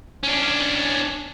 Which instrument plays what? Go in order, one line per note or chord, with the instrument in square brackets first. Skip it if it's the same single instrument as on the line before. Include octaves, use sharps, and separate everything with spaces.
[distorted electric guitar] C#4 D4